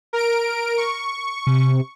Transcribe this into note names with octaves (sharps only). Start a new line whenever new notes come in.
A#4 D7
C#6
C3